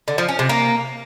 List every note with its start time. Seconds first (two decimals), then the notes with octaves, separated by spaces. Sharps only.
0.08 D3
0.18 F3
0.29 C#4
0.39 C3
0.49 A#3